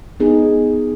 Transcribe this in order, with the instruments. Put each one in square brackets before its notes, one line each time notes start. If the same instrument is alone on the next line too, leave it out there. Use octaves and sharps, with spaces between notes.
[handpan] B3 D#4 G#4